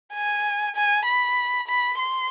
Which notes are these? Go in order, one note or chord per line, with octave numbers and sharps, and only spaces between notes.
G#5
G#5
B5
B5
C6